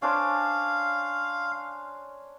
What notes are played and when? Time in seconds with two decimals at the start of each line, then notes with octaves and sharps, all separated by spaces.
0.02 C#4 D4 C5 F5